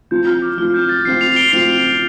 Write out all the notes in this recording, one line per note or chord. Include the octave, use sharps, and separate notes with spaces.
F3 C4 F4 G6
F6
D6
F3 C4 F4 F6
G6
A6
F3 C4 F4 C7
C7 F7
D7 G7
F3 C4 F4 C7 F7